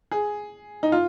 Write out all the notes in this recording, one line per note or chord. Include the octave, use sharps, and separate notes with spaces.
G#4
D#4
F4